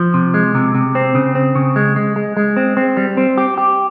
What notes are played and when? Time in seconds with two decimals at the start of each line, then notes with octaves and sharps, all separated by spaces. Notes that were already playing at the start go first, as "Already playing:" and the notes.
Already playing: F3
0.14 C3
0.34 G#3
0.55 C3
0.75 C3
0.95 C4
1.15 C#3
1.35 C4
1.55 C#3
1.76 G#3
1.96 G#3
2.16 G#3
2.37 G#3
2.57 C4
2.77 C4
2.97 G3
3.17 C4
3.38 G4
3.58 G4